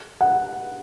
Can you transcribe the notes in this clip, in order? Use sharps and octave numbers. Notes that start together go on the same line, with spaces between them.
F#5